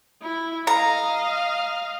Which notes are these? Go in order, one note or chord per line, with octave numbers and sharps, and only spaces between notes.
E4
D#5 F5 A#5